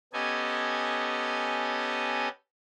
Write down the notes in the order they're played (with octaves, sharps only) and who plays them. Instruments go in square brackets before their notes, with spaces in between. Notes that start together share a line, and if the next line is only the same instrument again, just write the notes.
[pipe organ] B3 C#4 G4 A4 D#5 G#5